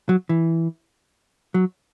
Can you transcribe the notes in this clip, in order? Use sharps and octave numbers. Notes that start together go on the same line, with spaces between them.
F#3
E3
F#3